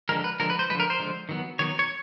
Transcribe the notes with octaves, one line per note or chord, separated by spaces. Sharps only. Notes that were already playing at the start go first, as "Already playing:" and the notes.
D3 F3 G#3 A#4
B4
D3 F3 G#3 A#4
B4
C5
D3 F3 G#3 B4
A#4
C5
D3 F3 G#3
D#3 F#3 B3
D#3 F#3 B3 C#5
C#5